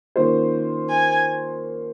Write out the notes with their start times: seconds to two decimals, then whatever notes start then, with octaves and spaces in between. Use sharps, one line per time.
0.16 D#3 A#3 C#4 F4 C5
0.90 G#5